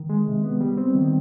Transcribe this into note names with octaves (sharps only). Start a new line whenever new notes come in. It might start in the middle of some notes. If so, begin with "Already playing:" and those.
Already playing: D#3
G#3
C3
B3
G3
C4
D#3